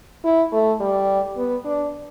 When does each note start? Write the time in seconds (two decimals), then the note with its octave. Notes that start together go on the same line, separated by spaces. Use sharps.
0.24 E4
0.53 A3
0.80 G3
1.37 B3
1.65 D4